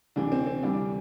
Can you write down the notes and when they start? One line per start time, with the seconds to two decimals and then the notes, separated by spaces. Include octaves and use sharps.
0.16 D2 C3 E3 D4
0.32 C4
0.47 C4
0.63 D2 C3 E3 G3 D4